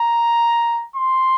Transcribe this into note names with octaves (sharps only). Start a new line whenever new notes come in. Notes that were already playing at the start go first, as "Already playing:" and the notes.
Already playing: A#5
C6